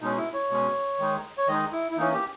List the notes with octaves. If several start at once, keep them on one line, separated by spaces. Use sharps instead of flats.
B2 G#3 C#4 D#4
E4
C#5
B2 G#3 C#4
D#3 G#3 D#4
C#5
D#3 G#3 D#4 D#5
E4
E4
E3 A#3 C#4 D#4
G4